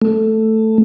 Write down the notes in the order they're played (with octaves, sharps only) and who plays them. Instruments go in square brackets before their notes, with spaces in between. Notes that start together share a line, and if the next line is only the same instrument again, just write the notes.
[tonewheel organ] A3